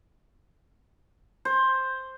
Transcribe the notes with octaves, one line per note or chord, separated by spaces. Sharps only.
C5